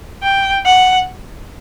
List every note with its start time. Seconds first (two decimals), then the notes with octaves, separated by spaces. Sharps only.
0.23 G5
0.65 F#5